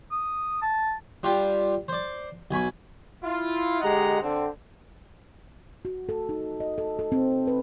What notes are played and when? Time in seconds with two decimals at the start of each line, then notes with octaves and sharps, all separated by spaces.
0.11 D#6
0.62 A5
1.23 G3 D4 F4 G4
1.88 C5 D5
2.51 B1 G#5 B5 C#6
3.24 E4 F4
3.82 D3 G#3 G4 D#5 F#5 A#5
4.22 D3 C4
5.85 F#4
6.09 A4
6.29 D#4
6.60 D#5
6.78 A4
6.99 A4
7.12 C4
7.47 B4